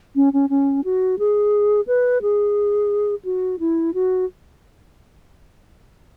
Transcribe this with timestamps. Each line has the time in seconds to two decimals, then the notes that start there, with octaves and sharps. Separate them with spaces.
0.16 C#4
0.33 C#4
0.50 C#4
0.84 F#4
1.19 G#4
1.87 B4
2.22 G#4
3.25 F#4
3.60 E4
3.94 F#4